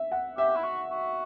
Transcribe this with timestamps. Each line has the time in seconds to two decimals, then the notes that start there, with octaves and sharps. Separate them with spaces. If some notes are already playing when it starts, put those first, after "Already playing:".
Already playing: E5
0.12 F#5
0.37 G4 E5
0.56 E4
0.64 F#4
0.91 F#4